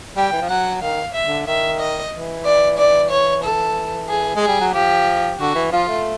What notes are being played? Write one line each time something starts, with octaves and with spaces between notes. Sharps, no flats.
G3 G5
E3
F3
F#3 F#5
D#3 F5
E5
D3
D#3 E5
D#5
E3
D5
D5
C#5
A4
G#4
G#3
G#4
G3
F#3
F3 G4
D3 F#4
E3
F3 F4
A3